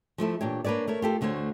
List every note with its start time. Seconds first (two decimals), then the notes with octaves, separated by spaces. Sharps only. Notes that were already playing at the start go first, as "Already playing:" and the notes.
0.18 F3 A3 E4 A4
0.41 A#2 E3 D4 G4 C#5
0.65 A#3 D4 B4 C#5 D5
0.88 A3 A#4 C#5
1.02 F4 G4 A4
1.21 D2 D3 A3 C5 C#5